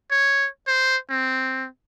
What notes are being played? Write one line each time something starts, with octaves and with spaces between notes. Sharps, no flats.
C#5
C5
C4